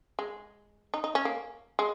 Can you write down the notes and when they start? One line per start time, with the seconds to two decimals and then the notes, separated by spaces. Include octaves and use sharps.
0.19 G#3
0.94 D#4
1.04 D#4
1.15 C#4
1.25 A#3
1.79 G#3